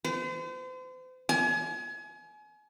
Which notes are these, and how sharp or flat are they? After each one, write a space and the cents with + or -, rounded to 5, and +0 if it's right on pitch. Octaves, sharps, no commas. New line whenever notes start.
C5 -40
G#5 +35